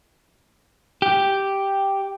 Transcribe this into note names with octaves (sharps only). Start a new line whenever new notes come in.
G4